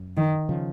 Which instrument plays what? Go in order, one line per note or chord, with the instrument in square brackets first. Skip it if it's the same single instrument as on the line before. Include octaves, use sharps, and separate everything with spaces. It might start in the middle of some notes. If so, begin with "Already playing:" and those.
Already playing: [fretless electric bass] F#2
[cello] D#3
[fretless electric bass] C#3 F3